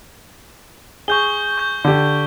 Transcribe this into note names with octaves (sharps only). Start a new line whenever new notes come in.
G#4 C#6 G6 G7
C#6 G6
D3 G4